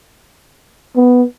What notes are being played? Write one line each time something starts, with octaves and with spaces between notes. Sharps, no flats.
B3